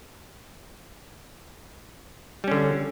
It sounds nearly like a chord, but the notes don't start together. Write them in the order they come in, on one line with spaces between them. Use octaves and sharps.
G3 C#4 D3